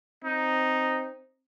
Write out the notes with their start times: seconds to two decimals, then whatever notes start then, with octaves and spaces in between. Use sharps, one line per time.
0.24 C4 D#4